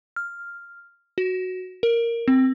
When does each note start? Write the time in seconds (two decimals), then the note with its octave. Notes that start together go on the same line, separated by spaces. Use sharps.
0.16 F6
1.18 F#4
1.83 A#4
2.28 C4